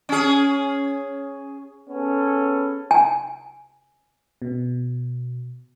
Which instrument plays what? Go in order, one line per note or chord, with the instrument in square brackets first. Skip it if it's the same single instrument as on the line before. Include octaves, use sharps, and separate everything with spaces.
[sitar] C#4 G#4
[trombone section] B3 C#4 G#4 A4
[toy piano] G#5
[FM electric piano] B2